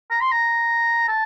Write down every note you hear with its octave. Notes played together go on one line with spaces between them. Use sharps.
A#5
C6
A#5
A5